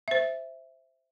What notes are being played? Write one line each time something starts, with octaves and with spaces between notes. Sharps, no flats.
C5 E5